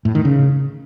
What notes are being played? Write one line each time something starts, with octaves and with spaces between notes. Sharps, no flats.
A2
D#3
C#3